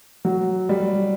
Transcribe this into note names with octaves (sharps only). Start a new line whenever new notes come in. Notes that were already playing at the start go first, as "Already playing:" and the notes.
F#3
G3